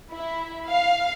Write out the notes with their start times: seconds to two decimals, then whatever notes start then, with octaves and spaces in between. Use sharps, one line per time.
0.12 E4
0.70 F5